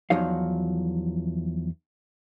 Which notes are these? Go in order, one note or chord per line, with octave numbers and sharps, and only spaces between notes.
E2 F3 F#3 D#4 F5